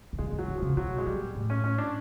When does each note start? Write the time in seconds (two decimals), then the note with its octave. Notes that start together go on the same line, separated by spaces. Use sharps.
0.13 C#3
0.19 D3 G#3
0.33 D#3
0.38 F#3
0.48 D3
0.58 C#3 F3
0.77 B2 F#3
0.98 G#3
1.06 A#2 G3
1.35 A2
1.50 C#4
1.64 C#4
1.78 D4